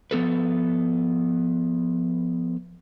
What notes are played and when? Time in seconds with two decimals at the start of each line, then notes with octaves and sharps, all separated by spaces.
0.11 F3 B3 A4 B4